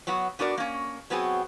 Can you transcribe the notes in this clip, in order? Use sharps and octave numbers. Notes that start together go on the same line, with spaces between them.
F#3 B3 F#4
B3 D4 F#4 A#4 D5
A#3 C#4
F#3 B3 C4 F#4 G#4